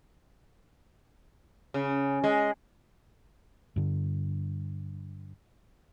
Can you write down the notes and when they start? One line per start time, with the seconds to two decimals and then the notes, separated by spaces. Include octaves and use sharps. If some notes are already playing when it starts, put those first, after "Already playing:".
1.74 C#3
2.24 G#3
3.76 G2 D3